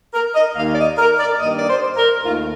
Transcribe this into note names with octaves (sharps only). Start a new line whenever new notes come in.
A#4
D#5
D#2 D#3 A#3 F5
D5
D#5
A#4
D5
G2 D#3 A#3 D#5
D5
C5
A#4
D#2 D#3 A3 F4